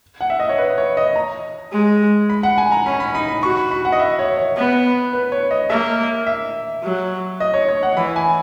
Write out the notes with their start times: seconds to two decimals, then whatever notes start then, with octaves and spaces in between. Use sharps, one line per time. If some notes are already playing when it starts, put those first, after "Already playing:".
0.21 F#5
0.30 E5
0.40 D#5
0.49 C#5
0.58 B4
0.78 C#5
0.97 D#5
1.16 A#5
1.72 G#3
2.30 B5
2.43 F#5
2.58 G#5
2.72 A#5
2.86 C#4 B5
3.00 B5
3.14 D#4 B5
3.28 B5
3.43 F#4 C#6
3.57 B5
3.71 B5
3.85 F#5
3.92 D#5
4.00 E5
4.19 C#5
4.38 C#5
4.56 B3
5.13 B4
5.32 C#5
5.51 D#5
5.70 A#3 E5
6.27 E5
6.83 F#3
7.40 D#5
7.54 C#5
7.69 C#5
7.83 F#5
7.97 E3 B5
8.16 G#5